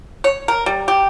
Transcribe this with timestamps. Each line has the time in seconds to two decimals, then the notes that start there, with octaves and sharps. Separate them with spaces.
0.24 C#5
0.48 A#4
0.66 G3
0.88 G4